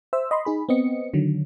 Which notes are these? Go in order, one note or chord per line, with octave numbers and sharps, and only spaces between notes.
C5 E5 E6
D#5 B5 C6
D#4 G#4 B5
B3 C4 D#5 C#7
D3 D#3 F#3